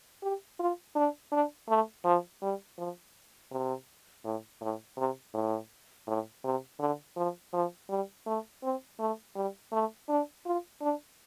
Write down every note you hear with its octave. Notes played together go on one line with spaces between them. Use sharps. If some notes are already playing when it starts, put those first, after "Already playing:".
G4
F4
D4
D4
A3
F3
G3
F3
C3
A2
A2
C3
A2
A2
C3
D3
F3
F3
G3
A3
C4
A3
G3
A3
D4
F4
D4